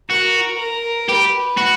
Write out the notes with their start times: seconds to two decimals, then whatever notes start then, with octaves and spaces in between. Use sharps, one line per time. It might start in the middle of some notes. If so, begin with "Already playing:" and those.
0.11 F#4 A#4
0.59 A#4
1.09 G4 B4
1.58 F#4